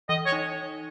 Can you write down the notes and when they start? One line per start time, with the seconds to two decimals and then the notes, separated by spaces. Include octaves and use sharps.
0.09 E3 D#5
0.26 C#5
0.32 D#4